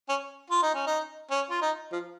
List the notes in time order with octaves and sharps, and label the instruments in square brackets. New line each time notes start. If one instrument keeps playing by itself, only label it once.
[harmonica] C#4
F4
D#4
C#4
D#4
C#4
F4
D#4
F3